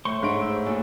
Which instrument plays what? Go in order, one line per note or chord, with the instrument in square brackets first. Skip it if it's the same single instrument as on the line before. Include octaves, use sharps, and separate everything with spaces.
[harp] A2 [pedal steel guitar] C5 C6 C#6
[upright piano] G#2 A3 D7
[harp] E6
D#2 A#2 A4